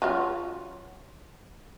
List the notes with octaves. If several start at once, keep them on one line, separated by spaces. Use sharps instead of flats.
F#3 C#4 F4